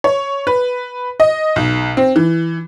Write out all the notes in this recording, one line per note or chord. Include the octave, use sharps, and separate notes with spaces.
C#5
B4
D#5
B1
C4
E3